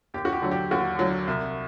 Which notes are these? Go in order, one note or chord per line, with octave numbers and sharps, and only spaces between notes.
D#2 G4
F#4
G4
D3 F#3
G4
D#2 F#4
D3 F#3
C2